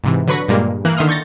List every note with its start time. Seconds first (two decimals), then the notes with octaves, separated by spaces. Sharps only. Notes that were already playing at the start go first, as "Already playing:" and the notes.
0.04 G#2 C3 E3
0.27 D3 F#3 B4 B5 C#6 A#6
0.48 G2 A#2 G3 G#3 A#3
0.85 E3 A#3 F#6
0.97 D3 D#3 E5 C6 D#6 F6
1.08 C#6 G6 A6 A#6